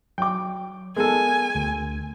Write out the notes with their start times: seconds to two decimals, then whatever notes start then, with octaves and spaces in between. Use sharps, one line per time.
0.18 F#3 G5 D6
0.96 G#3 B3 A4 A#4 G#5
1.55 D2